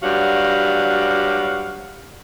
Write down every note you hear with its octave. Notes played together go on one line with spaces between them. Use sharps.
G2 F#3 G3 F#4 F5